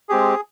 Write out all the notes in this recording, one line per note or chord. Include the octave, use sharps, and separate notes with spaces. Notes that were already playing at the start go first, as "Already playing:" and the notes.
G#3 C4 G4 G#4